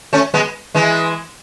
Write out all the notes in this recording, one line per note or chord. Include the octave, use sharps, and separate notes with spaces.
A3 C#4
G#3 B3
E3 G#3